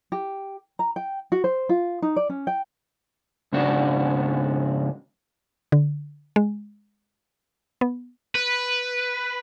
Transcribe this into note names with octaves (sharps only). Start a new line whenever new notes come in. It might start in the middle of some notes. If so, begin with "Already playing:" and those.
G4
A#5
G5
F#4
C5
F4
D#4
D5
C#4
G5
G#2 C#3 D4 F#4
D3
G#3
B3
B4